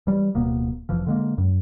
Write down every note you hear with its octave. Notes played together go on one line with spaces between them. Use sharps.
E3 G3
D1 B2 A#3 B3
F1 E3 F3
D3 G#3 A#3
F#2